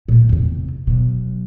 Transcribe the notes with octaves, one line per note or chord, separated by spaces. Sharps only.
A#2 A3
E2 C3
B2 F#3